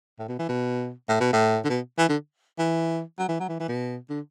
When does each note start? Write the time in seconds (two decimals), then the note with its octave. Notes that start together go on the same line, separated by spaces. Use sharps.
0.19 A2
0.28 B2
0.39 E3
0.49 B2
1.09 A2
1.20 B2
1.33 A2
1.65 D3
1.69 B2
1.98 E3
2.09 D3
2.59 E3
3.19 F#3
3.28 E3
3.40 F#3
3.49 E3
3.60 E3
3.69 B2
4.09 D3